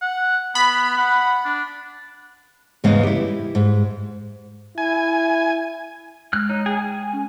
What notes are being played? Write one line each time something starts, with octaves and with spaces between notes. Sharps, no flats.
F#5
B3 B5
F#5
D4
E2 G#2 C#3 G#3 B3 F5
E4 G4
G#2
E4 G#5
G#3 F6 F#6
D#4 C#5
G#4 G5
G#5
C#4